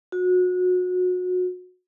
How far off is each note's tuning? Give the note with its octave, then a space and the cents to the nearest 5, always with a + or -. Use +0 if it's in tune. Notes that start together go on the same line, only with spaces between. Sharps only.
F#4 -30